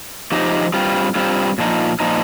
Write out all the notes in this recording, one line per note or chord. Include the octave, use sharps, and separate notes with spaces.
F3 D#4 G4 C5 D#5
G2 G3 C4 F4
G2 G3 C4 F4
A#2 F3 D#4
A#2 F3 D#4